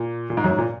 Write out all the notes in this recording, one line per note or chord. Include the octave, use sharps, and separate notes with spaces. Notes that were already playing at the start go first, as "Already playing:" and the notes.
Already playing: A#2
A#2
G#2
F#2
G#2
A#2